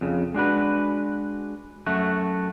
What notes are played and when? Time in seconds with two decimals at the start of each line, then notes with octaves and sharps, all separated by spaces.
0.01 F2 C#3
0.35 G#3 D4 F#4 B4
1.86 F#2 A3 F#4